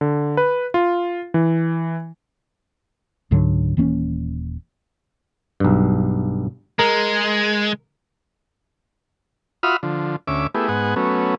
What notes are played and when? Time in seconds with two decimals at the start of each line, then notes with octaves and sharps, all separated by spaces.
0.01 D3
0.37 B4
0.74 F4
1.34 E3
3.31 C#2 G#2 D3 F#3
3.77 D#1 E3 A#3 C#4
5.60 B1 G2
6.79 G#3 A#4
9.63 F4 F#4 E5 B5 D#6 F6
9.83 D3 F3
10.27 D2 C#4 E5 D6
10.55 A3 B3 E4 G4 G#4
10.69 G#2 B3 F#5 G#5
10.96 F#3 A3 B3 C#4